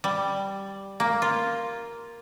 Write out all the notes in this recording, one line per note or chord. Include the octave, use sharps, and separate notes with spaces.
G3
A#3
F4